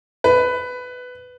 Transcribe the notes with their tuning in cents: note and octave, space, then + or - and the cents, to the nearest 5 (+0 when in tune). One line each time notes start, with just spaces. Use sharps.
B4 +10